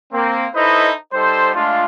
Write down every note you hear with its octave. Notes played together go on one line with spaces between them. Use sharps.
A#3 C4
D#4 E4 A4 B4 C5 D#5
G3 D#4 A4 C5
G#3 A3 D4 F4